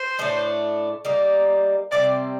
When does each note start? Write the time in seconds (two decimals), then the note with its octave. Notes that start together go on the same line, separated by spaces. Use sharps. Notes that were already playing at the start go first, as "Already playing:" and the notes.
Already playing: C5
0.19 A2 A3 D4
1.05 G3 A#3 D#4
1.91 C3 G3 C4 D5